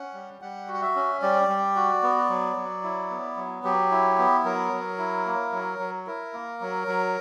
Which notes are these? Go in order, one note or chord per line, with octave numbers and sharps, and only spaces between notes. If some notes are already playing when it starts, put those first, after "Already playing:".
Already playing: C#4 F#5
G3
G3 F#5
F#4
F#5
E5
C#4
G3 D5
G3
F#4
B3
F#3
F#3
E4
B3
F#3
F#3 G4
E4
B3
F#3 A#4
F#3
E4
A#3
F#3
F#3
E4 A#4
A#3
F#3
F#3